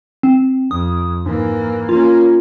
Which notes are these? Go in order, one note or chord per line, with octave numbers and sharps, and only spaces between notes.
C4
F2 D#6
G#2 E3 A#3
A#3 C#4 F4